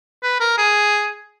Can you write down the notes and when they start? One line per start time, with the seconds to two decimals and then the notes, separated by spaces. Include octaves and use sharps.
0.23 B4
0.40 A#4
0.58 G#4